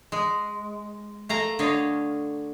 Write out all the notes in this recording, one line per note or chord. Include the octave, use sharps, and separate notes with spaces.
G#3
A3 F5 A#5
D3 C#5 D#5 F5